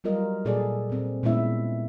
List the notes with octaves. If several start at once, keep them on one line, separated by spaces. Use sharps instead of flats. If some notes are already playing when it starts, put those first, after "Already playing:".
F#3 G3 F4 A#4 D#5
A#2 G#4 A4 D5
A#2 C4
A#2 G#3 B3 C#4 E4 E5